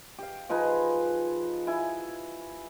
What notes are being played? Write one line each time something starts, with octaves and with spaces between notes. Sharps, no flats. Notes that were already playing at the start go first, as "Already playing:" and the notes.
G4 F5
F3 D#4 G#4 B4
E4 G#5